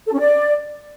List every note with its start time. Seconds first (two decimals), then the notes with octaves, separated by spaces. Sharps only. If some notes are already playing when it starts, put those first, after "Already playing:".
0.06 A4
0.13 C#4
0.20 D5